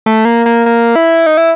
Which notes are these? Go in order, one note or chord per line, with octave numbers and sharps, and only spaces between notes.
A3
A#3
A#3
A#3
E4
D#4
E4